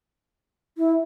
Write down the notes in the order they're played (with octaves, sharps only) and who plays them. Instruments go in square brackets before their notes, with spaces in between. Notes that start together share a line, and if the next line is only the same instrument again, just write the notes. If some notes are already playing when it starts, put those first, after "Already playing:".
[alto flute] E4